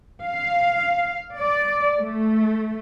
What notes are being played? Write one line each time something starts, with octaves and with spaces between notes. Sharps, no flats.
F5
D5
A3